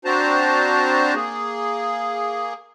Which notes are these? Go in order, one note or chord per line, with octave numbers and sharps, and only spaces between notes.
C4 D4 F#4 C5 A5 A#5
A#3 G#4